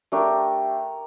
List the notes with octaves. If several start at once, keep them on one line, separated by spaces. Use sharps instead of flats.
A3 D4 G4 A#4